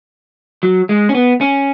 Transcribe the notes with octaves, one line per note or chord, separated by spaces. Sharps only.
F#3
G#3
C#4
B3
C#4